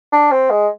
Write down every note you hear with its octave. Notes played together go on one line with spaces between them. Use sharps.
D4
C4
G#3